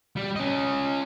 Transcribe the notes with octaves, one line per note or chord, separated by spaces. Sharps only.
G3
C#4 D#5